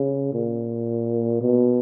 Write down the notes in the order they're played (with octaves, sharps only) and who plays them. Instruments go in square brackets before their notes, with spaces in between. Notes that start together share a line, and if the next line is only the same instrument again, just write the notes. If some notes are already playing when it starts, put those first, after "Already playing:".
Already playing: [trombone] C#3
A#2
B2